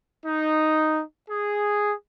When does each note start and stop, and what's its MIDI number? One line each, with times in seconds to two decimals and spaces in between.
0.25 1.03 63
1.30 1.93 68